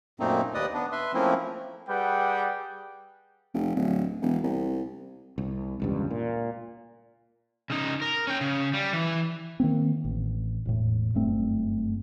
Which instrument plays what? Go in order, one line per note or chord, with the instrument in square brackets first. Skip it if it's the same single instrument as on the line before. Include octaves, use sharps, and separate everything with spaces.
[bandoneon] F#2 A#2 A3 A#3 C4 D#4
D#2 B4 D5 D#5 D#6
B3 D4
B4 E5 C6
F3 A3 A#3 C4 C#4 E4
[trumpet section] G3 G#4 B4 F#5 G5
[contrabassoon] F1
D1
E1
C2
[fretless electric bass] C2
E1 C#2 G2
A#2
[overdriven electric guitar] C#3 D#4
A#4
C#4 G5
C#3
G3
E3
[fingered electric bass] D#3 A#3 C4
A1
E1 A2
F#1 G2 A3 C4